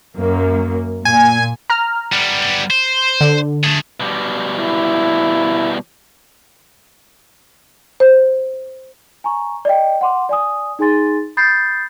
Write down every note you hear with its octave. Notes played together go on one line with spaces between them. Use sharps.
F#2 A#3
A#2 G#5
A#5 F6
G3 B3
C5
D3
A3 G#4
B2 G3
E4
C5
G#5 A#5 C#6
D5 D#5 G5
F#5 C6 D6
D5 G#5 D#6
D#4 G#4 G#5 C6 A6
B5 D#6 G6 A6 C7